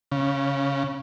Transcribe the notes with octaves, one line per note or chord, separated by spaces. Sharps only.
C#3